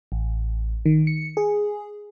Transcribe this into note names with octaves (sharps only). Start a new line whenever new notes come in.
A1
D#3
C#7
G#4